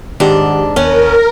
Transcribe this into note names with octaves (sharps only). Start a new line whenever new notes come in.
G#2 D#3 D4 G4 F#5
D#2 B3 C#4 A#4